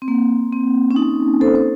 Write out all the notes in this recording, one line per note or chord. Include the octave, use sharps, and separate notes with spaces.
C4
A#3
C4
C#4
D#4
A4 C5
C5